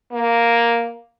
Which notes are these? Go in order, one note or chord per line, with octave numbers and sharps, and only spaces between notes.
A#3